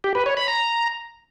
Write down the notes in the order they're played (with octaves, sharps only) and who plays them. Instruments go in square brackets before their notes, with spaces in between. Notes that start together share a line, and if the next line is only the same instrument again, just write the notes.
[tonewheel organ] G4
B4
C#5
B5
A#5